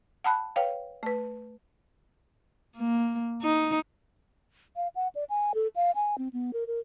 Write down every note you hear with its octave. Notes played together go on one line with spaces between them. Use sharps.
F#5 A5 B5 F#6
B4 C#5 F5 G5
A3 B4
A#3
D#4
F5
F#5
D5
G#5
A4
F5
G#5
C4
B3
A#4
A#4